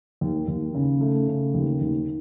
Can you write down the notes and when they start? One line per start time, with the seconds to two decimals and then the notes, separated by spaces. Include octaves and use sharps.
0.21 D#2
0.48 D#2
0.74 C#3
1.01 A3
1.28 C#3
1.54 D#2
1.81 D#2